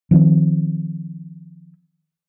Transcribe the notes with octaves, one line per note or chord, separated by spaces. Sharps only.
D#3 F3 B3 C4